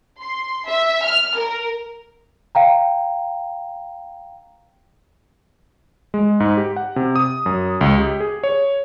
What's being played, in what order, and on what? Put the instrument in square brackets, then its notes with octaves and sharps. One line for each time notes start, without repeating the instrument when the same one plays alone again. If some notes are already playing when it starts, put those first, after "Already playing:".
[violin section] C6
E5
F6
A#4
[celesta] F5 G5 A#5
[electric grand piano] G#3
G#2
G4
F#5
C3
D#6
F#2
C#2
G4
G#4
C#5